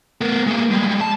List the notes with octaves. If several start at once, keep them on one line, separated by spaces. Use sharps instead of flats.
B3 A#4
G#3 A#3
G3 G#3
A5